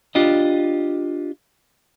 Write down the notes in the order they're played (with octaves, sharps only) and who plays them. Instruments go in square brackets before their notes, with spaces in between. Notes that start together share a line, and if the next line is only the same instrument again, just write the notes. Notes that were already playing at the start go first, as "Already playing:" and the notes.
[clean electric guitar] D4 F4 G4 D#5